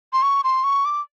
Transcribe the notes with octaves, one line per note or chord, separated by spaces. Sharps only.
C6
C#6
C6
C#6
D6